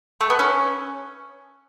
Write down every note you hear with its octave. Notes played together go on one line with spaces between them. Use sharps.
A3
B3
C#4